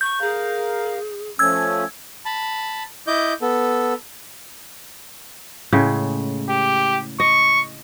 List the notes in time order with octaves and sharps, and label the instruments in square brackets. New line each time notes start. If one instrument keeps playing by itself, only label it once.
[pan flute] C#6 [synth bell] G6
[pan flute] G#4 [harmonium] A#4 F5
[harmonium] F3 A3 C#4 [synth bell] E6 G#6
[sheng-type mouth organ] A5 B5
E4 D#5 D6 G6
B3 A4
[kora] A2 C#3 G#3
[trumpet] G4
[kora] D#5 [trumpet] C#6